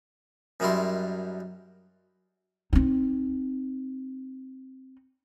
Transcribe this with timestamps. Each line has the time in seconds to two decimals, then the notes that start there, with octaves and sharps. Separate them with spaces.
0.60 F#2 D#3 F#3 G3 E4 C6
2.73 C4 D#4